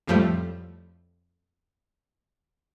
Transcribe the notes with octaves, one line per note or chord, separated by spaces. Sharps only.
F2 A2 F3 G3 A3